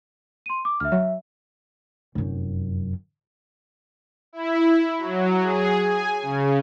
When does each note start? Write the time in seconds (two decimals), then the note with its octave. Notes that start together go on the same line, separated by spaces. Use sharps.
0.46 C6 D#7
0.65 D6
0.80 D2 E5 F6
0.92 F#3 E5
2.15 F1 F#2
4.33 E4
4.98 F#3
5.43 G#4
5.81 G#5
6.22 C#3